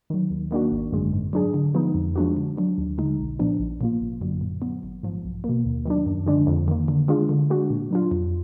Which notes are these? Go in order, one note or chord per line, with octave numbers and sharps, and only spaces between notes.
D#3 F#3
D#2
D#3 A#3 D4 F#4
G#1
F#2 D3 G#3
G#2
F#3 D4 G#4
D3
F3 G#3 B3 D#4
F2
F3 G#3 D4 F#4
D3
F#3 D4
D#2
D3 G#3 D#4
B1
A#2 F3 B3 D4
A#1
A#2 F3 A#3 F4
G#1
F#2 D3 F#3
A#2
F#3 B3
G#1
G#2 F3
B1
B2 A#3
D#2
D#3 F#3 D4
F#2
D3 F3 G#3 D4
F2
D#3 A#3
D3
G#3 D4 F4 G#4
D3
G#3 D4 F#4
A#2
F#3 D4 F4
F2